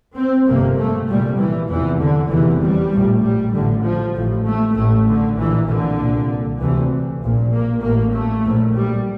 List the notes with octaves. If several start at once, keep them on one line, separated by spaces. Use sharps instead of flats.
C4
G1 F2 C3 A#3
A3
C2 A#2 G3
E3
F1 E2 C3 E3
D3
F1 E2 C3 E3
G3
A#1 A2
G3
A1 A2 D3
F3
A1 A2
A3
A1 A2 A3
D3
A#1 A#2 E3
D3
C2 A#2
D2 C3 E3
A#1 A#2
A#3
A1 A2 A#3
A3
A#1 A2
G3